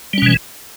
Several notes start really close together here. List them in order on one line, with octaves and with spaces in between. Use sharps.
G3 C#4 B2 E3